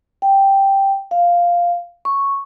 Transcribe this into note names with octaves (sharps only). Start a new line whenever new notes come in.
G5
F5
C#6